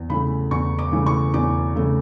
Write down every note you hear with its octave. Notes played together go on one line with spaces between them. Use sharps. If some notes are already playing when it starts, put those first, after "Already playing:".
Already playing: E2
C#3 E3 A3 B5
E2 C#6
D6
C#3 E3 A3
C#6
E2 D6
C#3 E3 A3